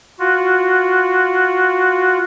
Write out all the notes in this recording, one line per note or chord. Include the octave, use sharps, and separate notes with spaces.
F4 F#4